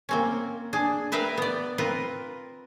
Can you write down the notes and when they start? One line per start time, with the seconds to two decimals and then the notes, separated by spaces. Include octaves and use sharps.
0.09 A#3 C4 C#4
0.73 D4 G#4
1.12 A#4 B4 E5 F5 G5
1.38 B3 D5
1.78 C4 F4 A#4 B4